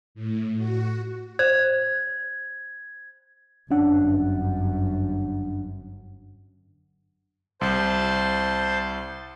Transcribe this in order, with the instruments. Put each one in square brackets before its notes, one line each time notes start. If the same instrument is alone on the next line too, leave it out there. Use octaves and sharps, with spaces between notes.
[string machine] A2
F#4
[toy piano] C5 [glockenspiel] G#6
[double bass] G1 F#2 [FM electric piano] C#4 D4 F#5
[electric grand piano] C2 [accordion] C5 A5 C6